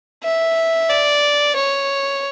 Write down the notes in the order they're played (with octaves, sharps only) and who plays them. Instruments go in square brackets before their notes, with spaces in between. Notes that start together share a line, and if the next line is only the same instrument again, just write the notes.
[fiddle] E5
D5
C#5